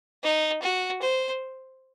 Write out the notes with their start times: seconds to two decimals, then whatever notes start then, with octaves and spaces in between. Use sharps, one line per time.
0.23 D#4
0.63 F#4
1.02 C5